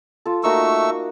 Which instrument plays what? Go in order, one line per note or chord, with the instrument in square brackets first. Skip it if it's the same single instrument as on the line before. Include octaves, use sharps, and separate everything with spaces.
[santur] F4 A4
[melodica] A3 C#6 E6 [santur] A#3 D#4 F#4